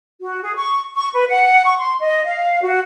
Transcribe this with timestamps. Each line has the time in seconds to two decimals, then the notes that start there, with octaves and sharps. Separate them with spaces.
0.21 F#4
0.43 G#4
0.56 C#6
0.95 C#6
1.14 B4
1.29 F#5
1.65 C#6
1.78 C6
2.01 D#5
2.24 F5
2.62 F#4